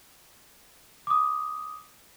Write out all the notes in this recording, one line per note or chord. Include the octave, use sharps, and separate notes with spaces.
D6 D#6